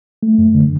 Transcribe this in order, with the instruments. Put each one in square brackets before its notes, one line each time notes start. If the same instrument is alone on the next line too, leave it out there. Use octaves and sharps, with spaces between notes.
[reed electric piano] A3
F#2
D3